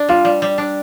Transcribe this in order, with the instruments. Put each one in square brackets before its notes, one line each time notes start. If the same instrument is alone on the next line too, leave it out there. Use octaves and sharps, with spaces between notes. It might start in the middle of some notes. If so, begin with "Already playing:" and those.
Already playing: [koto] D4
[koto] G3 [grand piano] F4
[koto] G3
G3
D4